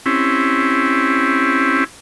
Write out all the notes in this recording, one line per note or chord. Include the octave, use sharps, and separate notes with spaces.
C4 C#4 E4 G4